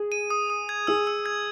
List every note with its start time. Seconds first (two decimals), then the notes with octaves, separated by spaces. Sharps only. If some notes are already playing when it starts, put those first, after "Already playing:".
Already playing: G#4
0.12 D#7
0.30 D#6
0.50 D#6
0.69 G#6
0.87 G#4 E6
1.07 E6
1.26 G#6